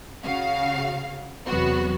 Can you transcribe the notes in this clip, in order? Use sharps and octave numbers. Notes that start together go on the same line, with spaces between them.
C#3 F#4 F5
E2 C3 F#3 B3 F#4